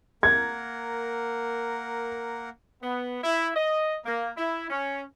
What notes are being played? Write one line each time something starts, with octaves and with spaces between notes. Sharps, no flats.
A#3 A#4 F#5 G#6
B3
E4
D#5
A#3
E4
C#4